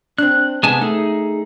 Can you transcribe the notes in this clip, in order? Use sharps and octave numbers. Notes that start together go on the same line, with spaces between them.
C4 D4 F#6
C3 G#3 B3 G#5 A5
A3 D#4 G#4